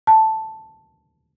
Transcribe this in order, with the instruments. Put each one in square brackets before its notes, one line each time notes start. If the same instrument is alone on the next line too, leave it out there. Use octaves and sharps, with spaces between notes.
[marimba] A5